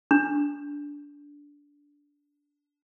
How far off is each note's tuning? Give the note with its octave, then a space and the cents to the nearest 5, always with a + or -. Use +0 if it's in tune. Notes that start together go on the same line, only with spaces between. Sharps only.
D4 -15